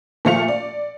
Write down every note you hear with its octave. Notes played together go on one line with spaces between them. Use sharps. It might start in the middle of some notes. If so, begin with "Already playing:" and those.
A#2 F3 A3 F5 C#7 F7
D5